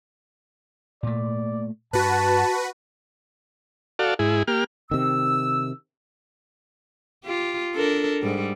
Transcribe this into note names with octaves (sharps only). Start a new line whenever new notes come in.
A#2 A3 D5
G2 F#4 B4 A5
F#4 A4 D5 F5
G#2 E4 G#4
A#3 G4 F6
C3 D#3 E6
F4 G4
D4 A4 A#4
G#2 G3